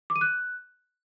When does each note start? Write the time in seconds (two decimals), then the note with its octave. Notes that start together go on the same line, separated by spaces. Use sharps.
0.10 D6
0.16 D#7
0.21 F#6